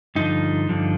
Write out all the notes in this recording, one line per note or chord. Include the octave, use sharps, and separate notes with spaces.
G2 D3 F3 D#4
G2 D3 F3